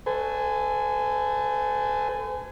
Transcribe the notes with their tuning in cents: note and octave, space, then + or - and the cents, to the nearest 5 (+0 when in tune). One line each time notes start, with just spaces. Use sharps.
A4 +0 C5 -45 G#5 +0